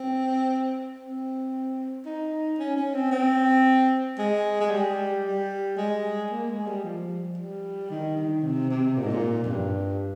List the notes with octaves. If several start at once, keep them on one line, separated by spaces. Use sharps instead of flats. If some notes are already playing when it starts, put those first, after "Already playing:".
Already playing: C4
C4
D#4
C#4
C#4
C4
C4
G#3
G#3
G3
G3
G#3
A#3
G#3
G3
F3
G3
D#3
D#3
C3
C3
A#2
G#2
A#2
F2
G2